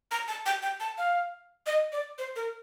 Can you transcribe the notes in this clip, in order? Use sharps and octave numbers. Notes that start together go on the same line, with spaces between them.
A#5
A5
G5
G5
A5
F5
D#5
D5
C5
A#4